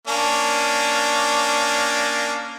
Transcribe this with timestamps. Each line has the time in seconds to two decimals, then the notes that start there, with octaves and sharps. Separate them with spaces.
0.08 A#3 C#4 D4